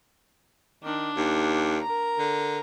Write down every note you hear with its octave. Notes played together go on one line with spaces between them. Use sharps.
D#3 D4
D#2
A#4 A#5
D3